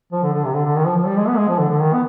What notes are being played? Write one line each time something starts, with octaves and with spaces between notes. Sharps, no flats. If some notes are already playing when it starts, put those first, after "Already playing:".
F3
D3
D3
C3
D3
D3
D#3
F3
F3
G3
G#3
B3
G#3
F3
D3
D3
D#3
B3